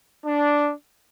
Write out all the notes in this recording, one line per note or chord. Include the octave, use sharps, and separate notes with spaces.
D4